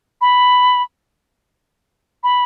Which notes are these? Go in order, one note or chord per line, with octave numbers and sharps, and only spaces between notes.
B5
B5